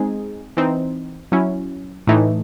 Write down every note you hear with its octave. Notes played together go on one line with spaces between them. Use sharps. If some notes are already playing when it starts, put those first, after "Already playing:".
Already playing: G#3 C4 D#4 G#4
E3 C4 D#4
F#3 C#4 E4
A2 E3 A3 D#4